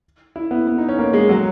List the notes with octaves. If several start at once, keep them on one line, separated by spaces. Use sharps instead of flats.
E4
B3
B3
D#4
C#4
A#3
G#3
F#3